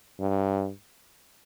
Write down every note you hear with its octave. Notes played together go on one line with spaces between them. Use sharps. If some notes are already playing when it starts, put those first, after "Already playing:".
G2